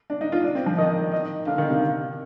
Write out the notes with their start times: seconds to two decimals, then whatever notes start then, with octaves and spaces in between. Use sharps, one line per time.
0.10 D4
0.21 D#4
0.32 F4
0.44 D4
0.55 C4
0.66 F3
0.78 D#3 D#5
1.12 D#5
1.47 D3 F5
1.58 D#3
1.70 C3